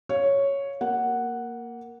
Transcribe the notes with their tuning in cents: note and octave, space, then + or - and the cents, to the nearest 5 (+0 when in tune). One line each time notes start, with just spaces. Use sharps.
C#5 +0 F5 +5
A#3 +0 F#5 +0